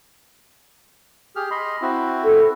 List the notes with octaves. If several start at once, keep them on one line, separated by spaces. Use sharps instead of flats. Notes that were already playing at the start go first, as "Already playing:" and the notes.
G4 G#4 F6
D#5 B5 C6
C4 E4 F#4
A4